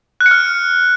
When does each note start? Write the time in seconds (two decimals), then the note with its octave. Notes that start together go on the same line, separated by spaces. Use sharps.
0.21 F#6
0.26 C#7
0.31 F6